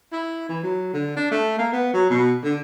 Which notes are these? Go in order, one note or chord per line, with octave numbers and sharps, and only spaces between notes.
E4
E3
F#3
D3
D4
A3
A#3
B3
F#3
B2
D3